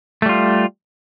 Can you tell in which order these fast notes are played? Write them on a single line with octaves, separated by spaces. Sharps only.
A3 G3 F4